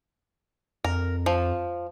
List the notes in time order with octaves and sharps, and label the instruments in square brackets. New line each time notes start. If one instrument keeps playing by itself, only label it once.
[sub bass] F2 [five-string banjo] A#4
[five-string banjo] F3